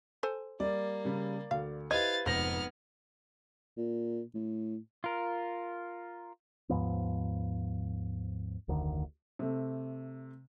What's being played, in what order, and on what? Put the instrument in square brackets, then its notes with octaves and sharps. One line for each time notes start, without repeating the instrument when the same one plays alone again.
[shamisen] A4 C5 G#5
[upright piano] G3 [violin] A#3 [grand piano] D5
[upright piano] C#3 G3
[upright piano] D2 [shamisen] F5
[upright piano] E4 G4 C5 [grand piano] B4 G#6 [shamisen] D#5 [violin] F5 A6
[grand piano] F1 A#6 [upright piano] G#2 F#7 [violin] B3 F6 [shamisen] C5
[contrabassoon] A#2
A2
[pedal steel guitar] F4 A#4
[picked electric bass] D#2 G#2 F3 B3
F1 D2 D3 D#3
[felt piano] C3 A3